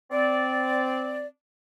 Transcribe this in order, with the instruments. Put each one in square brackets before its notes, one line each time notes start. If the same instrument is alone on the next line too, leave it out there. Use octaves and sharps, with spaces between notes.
[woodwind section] C4 D5